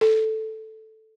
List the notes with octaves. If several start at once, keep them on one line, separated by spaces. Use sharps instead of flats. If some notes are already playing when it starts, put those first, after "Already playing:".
A4